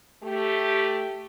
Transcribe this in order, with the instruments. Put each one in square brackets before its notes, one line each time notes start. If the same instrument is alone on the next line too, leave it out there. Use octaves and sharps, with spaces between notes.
[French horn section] A3 G4